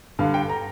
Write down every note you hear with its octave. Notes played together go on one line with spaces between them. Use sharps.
G2 D3 F5
G5
A#5